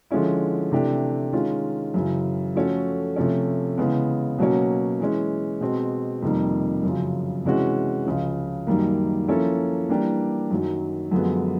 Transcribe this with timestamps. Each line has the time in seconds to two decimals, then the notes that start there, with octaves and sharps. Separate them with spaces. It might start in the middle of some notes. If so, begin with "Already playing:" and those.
0.11 D3 F3 G#3 C#4 E4
0.72 C3 E3 A3 D4 G4
1.33 D#3 G#3 C#4 F4
1.94 F#2 C#3 E3
2.55 F3 A3 C#4 F#4 A4
3.16 C3 F3 A3 C#4
3.78 C#3 E3 G#3 B3
4.38 B2 F#3 A#3 C#4
5.00 E3 G#3 C#4
5.61 B2 G#3 C4
6.22 F2 C3 D#3 G3 A#3
6.83 F#2 C#3 F3
7.45 C3 E3 G#3 C#4 F#4
8.06 C#2 C#3 F3
8.67 F#2 D#3 G3 A#3
9.28 F3 A#3 C#4 E4 A4
9.89 E3 G3 A#3 D4 G4
10.51 F#2 D#3 F#3
11.11 F#2 D3 F3 G#3 B3